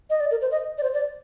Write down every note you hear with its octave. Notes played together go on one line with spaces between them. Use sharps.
D#5
D5
A#4
C5
D#5
D5
C5
D5